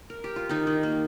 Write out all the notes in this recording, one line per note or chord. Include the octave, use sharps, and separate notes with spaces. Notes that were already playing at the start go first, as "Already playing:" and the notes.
A#4
G4
F4
D#3 D#4
D#3
A#3